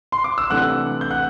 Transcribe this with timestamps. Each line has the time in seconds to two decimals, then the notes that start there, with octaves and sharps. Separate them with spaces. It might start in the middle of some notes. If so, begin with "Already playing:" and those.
0.12 C6
0.24 D6
0.38 E6
0.50 C3 E3 A3 D4 F#5 F#6
1.01 G6
1.10 F#5 F#6